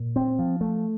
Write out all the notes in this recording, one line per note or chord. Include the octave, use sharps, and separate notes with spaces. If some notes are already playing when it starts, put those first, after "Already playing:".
Already playing: A#2
C4
F3
A3